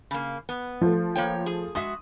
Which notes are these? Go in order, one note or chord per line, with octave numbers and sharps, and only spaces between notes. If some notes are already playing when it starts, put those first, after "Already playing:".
C#3 A#3
B3
F3 A3
A#3 C#5 G5
G#4
G#3 F#4 E5 D#6